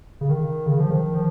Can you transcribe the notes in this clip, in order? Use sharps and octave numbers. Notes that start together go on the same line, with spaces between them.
C#3
D#3
C#3
F3
D#3
F3